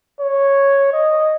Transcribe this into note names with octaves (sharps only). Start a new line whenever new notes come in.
C#5
D#5